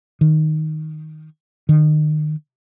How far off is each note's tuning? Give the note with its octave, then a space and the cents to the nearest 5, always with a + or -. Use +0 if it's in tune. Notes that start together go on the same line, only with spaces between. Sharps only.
D#3 +0
D#3 -30